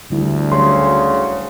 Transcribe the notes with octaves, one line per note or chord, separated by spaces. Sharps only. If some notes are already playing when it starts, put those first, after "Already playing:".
D2 D3 G3 E4
C#3 F#3 C6